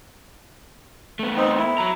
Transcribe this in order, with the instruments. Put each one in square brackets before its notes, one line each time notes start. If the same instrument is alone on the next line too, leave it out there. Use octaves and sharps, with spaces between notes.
[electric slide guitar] A3 B3
[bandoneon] C4 D#4
E4
[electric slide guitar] F#3 A#5